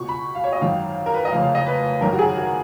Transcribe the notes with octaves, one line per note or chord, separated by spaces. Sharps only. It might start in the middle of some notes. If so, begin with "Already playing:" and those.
Already playing: C#2 B2 C#6
B5
F5
C#5
D#5
G#1 F#2 D#3 F5
A#4
B4
D#5
F1 F2 C#3 F5
F5
D#5
B4
G#1 F#2 D#3 A#4
F#4
G#4
F#4